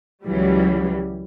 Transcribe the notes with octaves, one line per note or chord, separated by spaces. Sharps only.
C#2 E3 F#3 G3